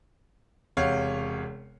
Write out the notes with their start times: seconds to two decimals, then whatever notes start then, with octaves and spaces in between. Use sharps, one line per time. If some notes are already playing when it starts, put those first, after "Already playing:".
0.77 E1 C3 C#5 F5 F#5